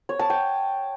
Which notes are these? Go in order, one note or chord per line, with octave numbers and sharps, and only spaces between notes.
C#5
A5
G5